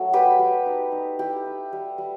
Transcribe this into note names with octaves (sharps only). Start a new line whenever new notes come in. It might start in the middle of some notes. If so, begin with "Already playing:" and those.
Already playing: F#3 A3
G3 G4 B4
G3
D#4
D#4
E4 G4
E4
G3
G3